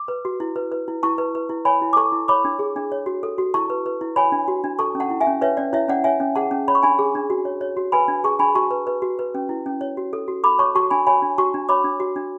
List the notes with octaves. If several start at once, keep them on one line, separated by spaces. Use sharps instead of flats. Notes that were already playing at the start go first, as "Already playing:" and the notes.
Already playing: D6
B4
F#4
E4
B4
B4
E4
E4 A5 C#6
B4
B4
E4
C#5 G#5 B5
E4
D6
A4 A5 C#6
E4
C#5 B5 D6
D4
G#4
D4
C#5
F#4
A4
F#4
E4 A5 C#6
B4
B4
E4
C#5 G#5 B5
D4
F#4
D4
A4 A5 C#6
C#4
F#5 A5
E4
E5 G#5
C#4
B4 C#5 E5
C#4 D5
E4 C#5 E5
C#4 D5 F#5
C#5 E5 G#5
C#4
G#4 F#5 A5
C#4
C#5 B5
C#6
D4 G#5 B5
G#4
D4
F#4
C#5
C#5
F#4
B4 G#5 B5
D4
G#4 A5 C#6
D4 G#5 B5
F#4 A5 C#6
B4
B4
F#4
B4
C#4
E4
C#4
C#5
F#4
A4
F#4
A4 B5 D6
C#5 A5 C#6
F#4 A5 C#6
D4 G#5 B5
C#5 G#5 B5
D4
F#4 A5 C#6
D4
C#5 B5 D6
D4
F#4
D4